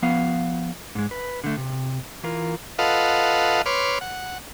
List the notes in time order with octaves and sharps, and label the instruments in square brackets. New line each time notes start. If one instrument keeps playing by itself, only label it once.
[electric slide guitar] F3 B3 F5
G#2 G#3
B4
D3 A3
C3
E3 F4 A#4
[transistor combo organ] F4 A4 B4 D#5 F5 F#5
B4 C#5 C6 D6 F6
F#5